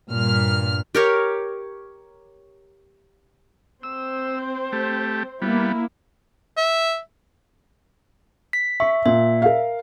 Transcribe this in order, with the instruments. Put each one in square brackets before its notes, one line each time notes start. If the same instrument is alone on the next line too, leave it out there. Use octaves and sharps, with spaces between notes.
[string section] G2 A#2 F6
[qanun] G4 A#4 C#5
[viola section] C4 C5 [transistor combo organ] E6
[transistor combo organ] A3 G4
[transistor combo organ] G3 B3 [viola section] A#3 E4
[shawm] E5
[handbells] B6
[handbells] E5 [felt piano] C#6
[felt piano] A#2 [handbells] E5
[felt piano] A#4 F5